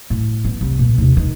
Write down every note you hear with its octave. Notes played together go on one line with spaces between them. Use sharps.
A2
B3
C2
A#2
D#2 C3
D#3